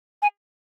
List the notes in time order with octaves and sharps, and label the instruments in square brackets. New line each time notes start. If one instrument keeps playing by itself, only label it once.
[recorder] G#5